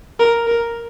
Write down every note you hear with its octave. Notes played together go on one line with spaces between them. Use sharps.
A#4
A#4